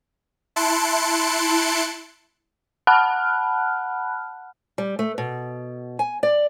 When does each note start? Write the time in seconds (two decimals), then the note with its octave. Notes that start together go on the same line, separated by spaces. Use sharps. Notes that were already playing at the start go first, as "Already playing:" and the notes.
0.56 E4 A5 C6 F#6 C#7 D7
2.87 F#5 A5 B5 F6 F#6
4.78 G3
4.99 A3
5.18 B2
5.99 G#5
6.23 D5